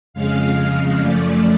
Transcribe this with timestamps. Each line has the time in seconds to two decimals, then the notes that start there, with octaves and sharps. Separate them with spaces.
0.14 F2 C#3 G#3 F5
0.99 F#2 C#3 F3 A3 D5